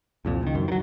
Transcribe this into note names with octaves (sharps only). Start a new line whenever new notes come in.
C2 F2 A#2
C#2 D#3
F#2
D#3 F#3